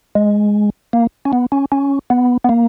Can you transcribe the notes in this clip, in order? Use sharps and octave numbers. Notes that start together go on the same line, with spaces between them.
G#3
A#3
C#4
B3
C#4
C#4
B3
B3
A#3